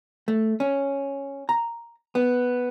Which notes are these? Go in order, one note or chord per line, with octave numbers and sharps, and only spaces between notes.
A3
C#4
A#5
B3